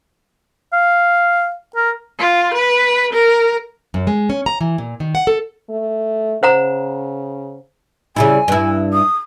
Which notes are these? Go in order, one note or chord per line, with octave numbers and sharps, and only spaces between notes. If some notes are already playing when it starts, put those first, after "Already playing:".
F5
A#4
F4
B4
A#4
F#2
G#3
C#4
A#5
E3
A#2
D#3
F#5
A4
A3
C#3 C5 F#5 A#5
C#3 G3 E4 G#5
G2 E4
D#6